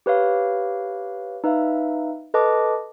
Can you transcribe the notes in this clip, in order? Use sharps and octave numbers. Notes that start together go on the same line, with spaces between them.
G4 B4 C#5 F5
D#4 B4 E5 F5
A4 B4 D#5 A5 D6